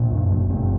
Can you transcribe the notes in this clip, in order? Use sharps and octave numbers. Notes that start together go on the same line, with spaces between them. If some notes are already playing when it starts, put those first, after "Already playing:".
Already playing: A#2 D4
F#2
F#1
F#1 C4